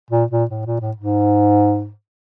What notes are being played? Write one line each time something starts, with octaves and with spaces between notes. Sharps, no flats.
A#2
A#2
A2
A#2
A2
G#2